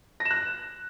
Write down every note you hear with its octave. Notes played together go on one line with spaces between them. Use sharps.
A#6
E7
F#6